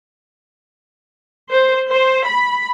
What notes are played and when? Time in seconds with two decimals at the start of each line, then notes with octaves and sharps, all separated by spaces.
1.49 C5
1.89 C5
2.24 B5